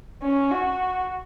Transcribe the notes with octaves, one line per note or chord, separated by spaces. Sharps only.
C#4
F#4